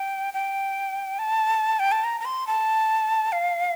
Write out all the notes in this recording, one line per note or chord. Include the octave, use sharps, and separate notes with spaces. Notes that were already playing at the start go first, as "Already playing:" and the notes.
Already playing: G5
G5
A5
G5
A5
A#5
A#5
C6
A5
F5